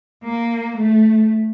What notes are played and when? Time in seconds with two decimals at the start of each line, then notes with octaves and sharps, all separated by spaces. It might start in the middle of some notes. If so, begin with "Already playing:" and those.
0.24 A#3
0.77 A3